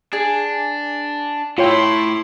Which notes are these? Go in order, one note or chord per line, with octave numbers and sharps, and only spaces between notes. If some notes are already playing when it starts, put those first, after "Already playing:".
D4 G#4
A2 E4 F4 C#5 G5 C6